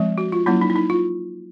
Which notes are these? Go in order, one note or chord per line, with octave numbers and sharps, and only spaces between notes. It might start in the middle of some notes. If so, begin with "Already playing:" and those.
Already playing: F3 G#3 C4
F#4
F4
F#3 A#3 C#4 E4
D#4
E4
D#4
F4